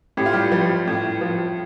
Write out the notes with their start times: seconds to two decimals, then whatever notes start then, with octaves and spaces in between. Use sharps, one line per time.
0.17 A2 G4
0.26 F4
0.33 G3 G4
0.52 F3 G3 G4
0.87 A2
1.21 F3